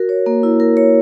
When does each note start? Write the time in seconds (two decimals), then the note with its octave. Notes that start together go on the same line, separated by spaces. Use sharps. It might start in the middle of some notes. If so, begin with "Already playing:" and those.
Already playing: F#4 A#4
0.09 C#5
0.26 A#3
0.43 E4
0.60 A#4
0.77 C#5